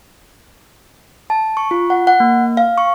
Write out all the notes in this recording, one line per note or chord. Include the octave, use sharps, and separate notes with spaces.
A5
C#6
F4
F#5
F#5
A#3
F5
C#6